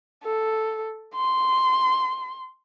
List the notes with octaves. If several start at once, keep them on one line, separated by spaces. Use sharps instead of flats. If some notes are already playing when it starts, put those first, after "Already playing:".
A4
C6